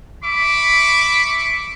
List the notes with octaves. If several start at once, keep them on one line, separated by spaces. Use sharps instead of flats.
E5 B5 C#6 D6